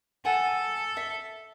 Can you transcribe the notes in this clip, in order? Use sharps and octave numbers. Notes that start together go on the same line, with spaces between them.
A4 F#5 G#5
E5